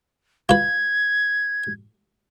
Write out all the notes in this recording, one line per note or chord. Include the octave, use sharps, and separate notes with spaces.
F4 B4 G#6